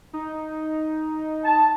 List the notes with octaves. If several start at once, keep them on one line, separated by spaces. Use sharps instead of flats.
D#4
A5